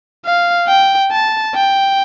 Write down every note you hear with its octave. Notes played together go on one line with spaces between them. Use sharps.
F5
G5
A5
G5